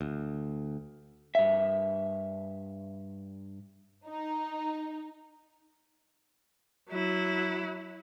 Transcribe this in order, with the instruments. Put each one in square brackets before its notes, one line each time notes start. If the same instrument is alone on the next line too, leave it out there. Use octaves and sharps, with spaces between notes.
[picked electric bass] D2
[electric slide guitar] G2 E5
[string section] D#4
[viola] F#3 E4